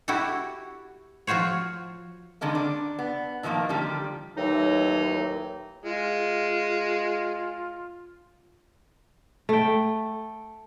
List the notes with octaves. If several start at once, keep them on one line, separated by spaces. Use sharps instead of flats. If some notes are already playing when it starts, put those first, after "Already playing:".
E4 F#4 G4 A4
F3 F4 F#4 C5 C#5
D3 D#3 G#3 A#3
D4
B3
A2 D#3 F3 G#3 A#3
D3 D#3 F3 G3 G4
D#2 A2 E3 F#3 D#4
G#3 F4
A3 G5